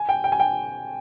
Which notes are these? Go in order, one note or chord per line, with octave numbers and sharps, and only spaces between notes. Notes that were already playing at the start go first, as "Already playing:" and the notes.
Already playing: G#5
G5
G5
G#5
G5